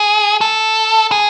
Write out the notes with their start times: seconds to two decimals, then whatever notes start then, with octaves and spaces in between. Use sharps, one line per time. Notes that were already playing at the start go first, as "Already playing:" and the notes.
Already playing: G#4
0.41 A4
1.12 G#4